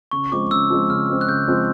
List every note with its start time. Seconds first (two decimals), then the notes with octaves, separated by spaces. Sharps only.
0.11 C#3 C#6
0.32 F3 G#3 C4 D6
0.51 C#3 E6
0.70 F3 G#3 C4
0.90 C#3 F6
1.09 F3 G#3 C4
1.21 F#6
1.28 C#3 G6
1.48 F3 G#3 C4